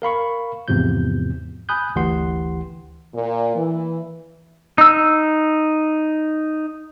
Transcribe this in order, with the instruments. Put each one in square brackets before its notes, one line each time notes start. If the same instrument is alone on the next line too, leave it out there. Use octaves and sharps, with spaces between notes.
[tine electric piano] A#4 F5 B5 C#6
E2 G#2 C3 F3 G6
G#5 B5 D#6 F#6 G6
G1 D2 E3 G4 F#5 C6
[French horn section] A#2
E3
[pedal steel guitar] D#4 E6